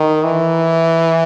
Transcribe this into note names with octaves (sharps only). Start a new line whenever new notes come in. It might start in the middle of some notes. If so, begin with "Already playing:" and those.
Already playing: D#3
E3